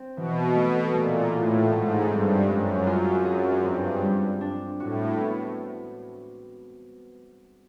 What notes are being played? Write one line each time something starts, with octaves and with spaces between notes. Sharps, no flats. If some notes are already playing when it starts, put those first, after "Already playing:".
Already playing: C4
B2 E3
A3
A#2 A3
A2 F4
G#2 A3
G2 C4
F#2 G#3
F4
F#2 G#4
G2 C4
G3
D4
A2 F#4
B3